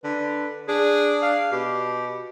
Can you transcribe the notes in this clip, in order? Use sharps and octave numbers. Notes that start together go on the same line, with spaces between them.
D3 B4
D4 G#4
F5
B2 G4